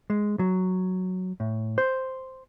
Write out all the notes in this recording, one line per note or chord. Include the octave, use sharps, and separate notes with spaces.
G#3
F#3
A2
C5